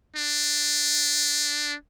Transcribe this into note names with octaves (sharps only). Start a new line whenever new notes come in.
D4